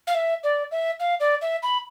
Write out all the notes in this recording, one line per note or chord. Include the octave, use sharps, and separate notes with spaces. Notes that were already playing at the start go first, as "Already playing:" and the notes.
F5
E5
D5
E5
F5
D5
E5
B5